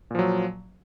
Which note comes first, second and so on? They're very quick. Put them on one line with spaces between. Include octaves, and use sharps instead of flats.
A#2 F3 F#3